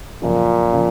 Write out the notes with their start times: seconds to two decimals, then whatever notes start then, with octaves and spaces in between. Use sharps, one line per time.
0.22 F#2 A#2 C#3 F3
0.72 C#3 F3